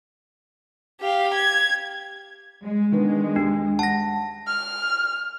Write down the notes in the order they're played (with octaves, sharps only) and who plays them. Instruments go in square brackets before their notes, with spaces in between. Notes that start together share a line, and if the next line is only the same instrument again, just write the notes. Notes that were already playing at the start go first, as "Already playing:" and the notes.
[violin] G4 F5
G#6
[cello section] G#3
[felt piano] D#3 B3 D4
[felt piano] D#2 [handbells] D4
[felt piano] F#5 [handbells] A5 A#6
[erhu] F6